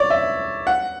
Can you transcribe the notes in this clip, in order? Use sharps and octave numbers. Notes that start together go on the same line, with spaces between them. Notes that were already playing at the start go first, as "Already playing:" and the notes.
Already playing: C#5 D5
E5
F#5